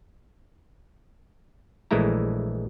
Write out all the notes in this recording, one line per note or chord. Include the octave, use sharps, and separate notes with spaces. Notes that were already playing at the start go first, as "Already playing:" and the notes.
A#1 E3 G#3 A3 E4 A#5